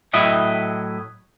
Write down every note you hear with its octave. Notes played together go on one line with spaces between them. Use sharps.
A2 F#3 E4 D#5 E5 G5